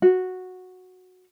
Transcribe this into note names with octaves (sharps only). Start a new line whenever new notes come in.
F#4